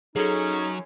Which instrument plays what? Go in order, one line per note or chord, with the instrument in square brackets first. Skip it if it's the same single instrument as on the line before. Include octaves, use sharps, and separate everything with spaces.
[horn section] F#2 C#4 [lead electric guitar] F#3 [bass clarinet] D#4 [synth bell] G#4 A4